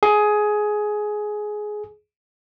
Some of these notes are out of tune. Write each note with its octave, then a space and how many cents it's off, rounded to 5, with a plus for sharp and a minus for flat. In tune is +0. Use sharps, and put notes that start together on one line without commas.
G#4 +15